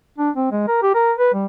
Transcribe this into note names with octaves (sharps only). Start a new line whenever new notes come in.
D4
C4
G#3
A#4
G4
A#4
B4
G3